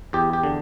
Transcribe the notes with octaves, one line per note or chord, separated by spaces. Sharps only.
E2 G4
G4
D3